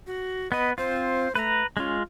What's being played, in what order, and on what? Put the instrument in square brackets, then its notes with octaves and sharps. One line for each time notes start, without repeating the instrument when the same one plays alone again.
[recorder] F#4
[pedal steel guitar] B3 B4 [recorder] D#5
[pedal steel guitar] C4 F4 [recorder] C5
[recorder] A3 [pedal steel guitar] B4 A#5
[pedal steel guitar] G#3 F4 [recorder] C#4